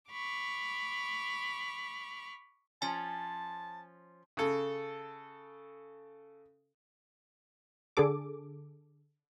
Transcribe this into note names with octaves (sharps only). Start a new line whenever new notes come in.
B5 C#6 D6 F6
F3 C#4 G#5 A5
C#3 A4
D3 G#4 A4 D6